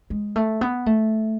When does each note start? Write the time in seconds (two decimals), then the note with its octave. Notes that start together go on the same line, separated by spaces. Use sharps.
0.10 G#3
0.36 A3
0.61 B3
0.86 A3